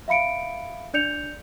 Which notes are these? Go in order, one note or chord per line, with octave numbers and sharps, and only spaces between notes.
E5 F5 B5 C#7 D7
D4 D5 G6 C#7 F7